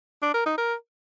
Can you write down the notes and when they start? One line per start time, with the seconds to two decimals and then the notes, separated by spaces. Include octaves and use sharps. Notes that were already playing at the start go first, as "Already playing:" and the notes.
0.22 D4
0.34 A#4
0.46 D#4
0.58 A#4